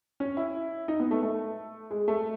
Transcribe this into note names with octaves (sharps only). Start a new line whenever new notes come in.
C#4
E4
D#4
B3
A3
A3
G#3
A3